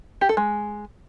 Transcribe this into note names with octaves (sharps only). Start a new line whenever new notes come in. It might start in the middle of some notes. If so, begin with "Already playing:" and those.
G4
A4
G#3